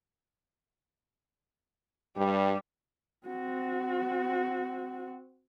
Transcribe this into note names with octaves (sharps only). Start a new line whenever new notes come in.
G2 G3
C4 F#4